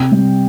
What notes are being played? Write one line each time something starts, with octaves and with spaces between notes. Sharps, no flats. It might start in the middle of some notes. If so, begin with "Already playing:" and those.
Already playing: C3 G5
G3